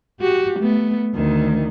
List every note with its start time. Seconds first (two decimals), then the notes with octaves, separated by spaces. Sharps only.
0.20 F#4 G4
0.59 A3 B3
1.15 D2 D#3